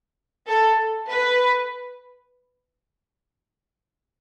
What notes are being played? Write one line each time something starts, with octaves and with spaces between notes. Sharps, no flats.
A4
B4